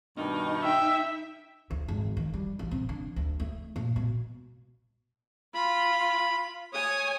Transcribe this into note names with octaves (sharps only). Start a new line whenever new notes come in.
G2 B2 D#3 D#4
E5 G5
D2
G#1
D#3
G3
A1
C3
D3
D2
A3
A#2
B2
F4 B5
C#5 G#5 D#6